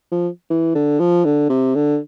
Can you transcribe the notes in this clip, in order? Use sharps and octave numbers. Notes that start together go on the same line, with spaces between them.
F3
E3
D3
F3
D3
C3
D3